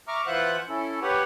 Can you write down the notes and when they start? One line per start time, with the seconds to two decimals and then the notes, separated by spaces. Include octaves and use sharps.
0.08 E5 A#5 C#6 D6 F6
0.26 E3 F4 C5 E5 F#5 F#6
0.69 C#4 E4 A4
1.02 G4 B4 C#5 F#5